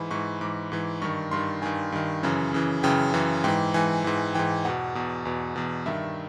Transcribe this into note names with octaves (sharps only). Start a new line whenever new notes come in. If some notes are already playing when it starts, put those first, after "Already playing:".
Already playing: G#2 E3 B5
G#2 E3 C#6
G#2 E3 D6
G#2 E3
G2 D#3 C#6
G2 D#3 C6
G2 D#3 G#5
G2 D#3
F#2 C#3 E3
F#2 C#3 E3
F#2 C#3 E3 G5
F#2 C#3 E3
G#2 E3 G5
G#2 E3 G#5
G#2 E3
G#2 E3 G5
E2 B2 F#5
E2 B2
E2 B2
E2 B2
G2 D#3 E5